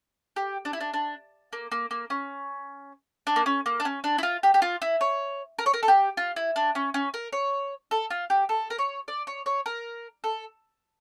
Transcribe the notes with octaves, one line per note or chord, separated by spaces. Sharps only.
G4
D4
E4
D4
D4
A#3
A#3
A#3
C#4
D4
A#3
C#4
A#3
D4
C#4
D4
E4
F4
G4
G4
F4
E4
C#5
A#4
C#5
A#4
A4
G4
F4
E4
D4
C#4
C#4
A#4
C#5
A4
F4
G4
A4
A#4
C#5
D5
C#5
C#5
A#4
A4